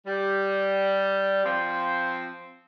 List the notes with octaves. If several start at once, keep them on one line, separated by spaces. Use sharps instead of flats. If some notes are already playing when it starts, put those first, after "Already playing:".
G3
F3 C4